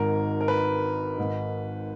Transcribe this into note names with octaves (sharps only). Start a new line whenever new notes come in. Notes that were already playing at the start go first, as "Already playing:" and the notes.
Already playing: G#1 G#2 D#3 A#4
A#4
B4
G#1 G#2 D#3